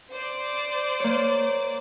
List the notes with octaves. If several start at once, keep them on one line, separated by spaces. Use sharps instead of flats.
C5 D5
A#3 C#5